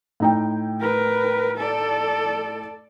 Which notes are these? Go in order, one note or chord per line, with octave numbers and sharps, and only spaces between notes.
A2 D#4 G5
A#4 B4
A4 D5